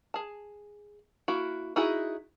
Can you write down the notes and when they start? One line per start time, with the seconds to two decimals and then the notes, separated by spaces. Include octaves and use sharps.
0.14 G#4 A5
1.28 A#3 E4 F#4
1.76 D#4 E4 F#4 G#4